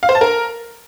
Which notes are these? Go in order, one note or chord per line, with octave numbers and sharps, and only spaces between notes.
F5
C5
A5
A#4